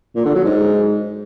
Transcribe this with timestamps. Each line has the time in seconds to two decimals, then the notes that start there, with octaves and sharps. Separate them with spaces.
0.16 A#2
0.25 D3
0.35 F#3
0.44 G#2